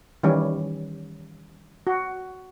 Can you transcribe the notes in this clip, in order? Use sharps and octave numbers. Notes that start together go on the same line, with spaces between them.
D#3 E3 G3 C#4
F#4